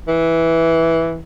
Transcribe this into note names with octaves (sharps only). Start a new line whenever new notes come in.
E3